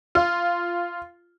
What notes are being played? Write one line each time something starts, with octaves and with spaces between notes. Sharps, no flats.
F4